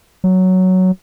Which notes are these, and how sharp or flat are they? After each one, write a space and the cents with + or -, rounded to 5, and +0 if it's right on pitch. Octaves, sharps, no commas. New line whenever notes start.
F#3 +5